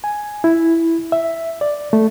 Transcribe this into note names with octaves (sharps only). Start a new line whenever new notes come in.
G#5
E4
E5
D5
A3